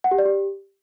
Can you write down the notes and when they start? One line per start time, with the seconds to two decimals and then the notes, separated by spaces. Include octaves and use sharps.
0.04 F#5
0.11 G4
0.18 D5
0.26 G4